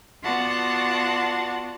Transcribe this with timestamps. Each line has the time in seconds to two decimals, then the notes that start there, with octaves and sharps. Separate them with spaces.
0.23 B3 F4 F#4 D5 F#5 A5